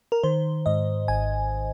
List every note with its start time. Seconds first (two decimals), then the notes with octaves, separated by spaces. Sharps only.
0.12 A#4
0.23 D#3 C5
0.66 G#2 D#5
1.08 G#1 G#5